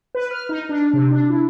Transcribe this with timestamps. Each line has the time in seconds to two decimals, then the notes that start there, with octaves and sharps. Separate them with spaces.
0.15 B4
0.31 F6
0.49 D#4
0.69 D4
0.93 C3
1.11 D4
1.30 E4